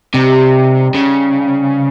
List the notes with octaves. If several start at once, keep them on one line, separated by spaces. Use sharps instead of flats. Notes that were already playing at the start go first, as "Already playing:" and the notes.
C3 G3 C4 D#4 G4
C#3